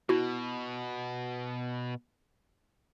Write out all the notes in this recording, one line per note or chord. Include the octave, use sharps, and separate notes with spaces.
B2 E4 F#4